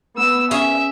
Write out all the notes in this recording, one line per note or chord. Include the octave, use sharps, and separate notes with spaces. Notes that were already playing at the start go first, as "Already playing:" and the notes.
B3 E6
C#4 G#4 E5